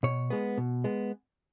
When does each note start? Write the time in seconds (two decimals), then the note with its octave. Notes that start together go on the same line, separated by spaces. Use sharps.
0.03 B2 C#5
0.30 G#3 B3
0.58 B2
0.84 G#3 B3